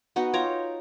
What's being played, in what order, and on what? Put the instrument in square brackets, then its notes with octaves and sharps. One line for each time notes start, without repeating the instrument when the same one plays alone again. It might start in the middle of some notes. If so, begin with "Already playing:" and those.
[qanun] B3 D#4 F#4 D#5
F4 C#5 G5 A#5